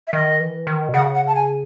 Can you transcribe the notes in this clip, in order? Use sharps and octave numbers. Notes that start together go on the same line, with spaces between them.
E5
D#3 D#5
E3
D#3
B2
C#3 F#5
F#5
A5
G#5